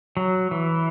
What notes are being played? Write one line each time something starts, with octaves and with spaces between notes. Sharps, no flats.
F#3
E3